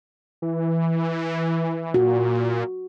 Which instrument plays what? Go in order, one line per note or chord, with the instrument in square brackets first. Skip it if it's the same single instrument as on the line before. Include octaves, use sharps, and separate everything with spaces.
[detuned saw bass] E3
[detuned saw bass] A#2 [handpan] F#4